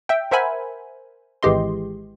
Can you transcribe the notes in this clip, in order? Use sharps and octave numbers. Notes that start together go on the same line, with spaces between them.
E5 G5
A#4 C5 E5 F#5 G#5 B5
G#1 E3 G#3 G4 D#5 C6